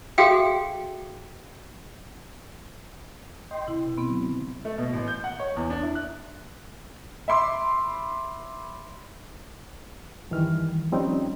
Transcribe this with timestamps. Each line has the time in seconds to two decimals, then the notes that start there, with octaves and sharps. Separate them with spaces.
0.18 F#4 G#4 A4 E5 F5 G5
3.51 D#5 G5 C6
3.68 C3 E4
3.84 B2
3.98 B3 C4
4.09 D3 F#3
4.65 A3
4.78 B2
4.93 A1
5.08 G6
5.24 F#5
5.39 C#5
5.57 E2
5.70 D4
5.83 E4
5.95 F#6
7.28 E5 B5 C6 D6
10.31 F#2 D#3 E3 G3 F6
10.92 F3 G3 C4 C#4 D#4